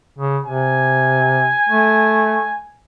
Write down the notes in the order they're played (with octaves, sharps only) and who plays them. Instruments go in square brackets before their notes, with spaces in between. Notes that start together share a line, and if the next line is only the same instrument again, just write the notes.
[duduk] C#3
[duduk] C3 [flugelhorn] G#5
[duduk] A3